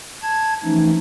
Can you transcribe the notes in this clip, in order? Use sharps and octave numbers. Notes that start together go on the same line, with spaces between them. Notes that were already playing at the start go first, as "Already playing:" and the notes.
A5 G#6
E3 F3 A3 C#4 D#4